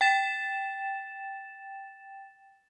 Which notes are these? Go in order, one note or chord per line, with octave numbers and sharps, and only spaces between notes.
G5 A6 E7